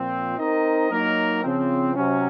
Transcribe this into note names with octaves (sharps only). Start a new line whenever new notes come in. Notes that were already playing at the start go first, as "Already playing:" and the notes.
Already playing: A#2 F3 C4
C4 D#4 A#4 D#5
F#3 A#3 D#4 A#4
C#3 F3 C4
C3 F#3 C#4